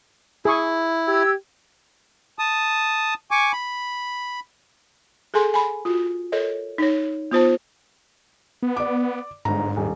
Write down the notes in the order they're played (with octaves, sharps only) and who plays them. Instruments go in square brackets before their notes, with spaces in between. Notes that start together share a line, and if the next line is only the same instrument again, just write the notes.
[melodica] E4 [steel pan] G#4 C#6
[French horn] G4 [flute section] E6 G#6
[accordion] A5 D#6
G#5 C#6 D6
B5
[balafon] G#4 A4 G#5 C6
G#5 B5
F4 F#4
A4 A#4 C#5 D#5
D#4 C#5
B3 F4 C5 A5
[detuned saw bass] B3
[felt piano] D5 D6
[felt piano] G1 A#5 [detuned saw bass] G#2
[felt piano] D#1